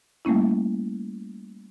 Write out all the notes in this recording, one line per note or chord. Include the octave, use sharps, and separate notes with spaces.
G3 A3 A#3 C#4 E4